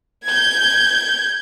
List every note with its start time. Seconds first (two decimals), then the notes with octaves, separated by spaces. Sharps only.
0.25 G6 G#6